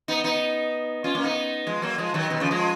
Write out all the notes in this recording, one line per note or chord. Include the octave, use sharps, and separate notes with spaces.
B3 D#4
B3 D#4
C#4 F4
A#3 C#4
B3 D#4
F3 G#3
F#3 A#3
F3 G#3
D#3 F#3
B2 D#3
C#3 F3
F3 G#3